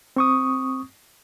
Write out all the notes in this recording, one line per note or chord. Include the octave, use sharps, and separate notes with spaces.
C4 C#6 D#6